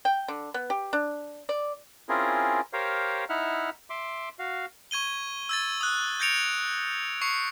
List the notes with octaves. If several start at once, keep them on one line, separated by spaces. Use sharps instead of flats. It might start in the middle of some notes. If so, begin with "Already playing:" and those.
G5
D3
B3
G4
D4
D5
C4 C#4 E4 F4 G#4 A#4
G4 A#4 C5 C#5 F5
D#4 E4 E5 F#5 F6
E5 C6 D6
F#4 F5
C#6 G#6 D#7 G7
E6 G#6 A6
D#6 F#6
G6 G#6 A#6 C#7 D7 F7
C#6 C7 C#7